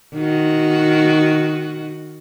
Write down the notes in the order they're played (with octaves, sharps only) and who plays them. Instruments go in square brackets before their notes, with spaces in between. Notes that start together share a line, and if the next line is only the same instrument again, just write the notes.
[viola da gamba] D#3 F#4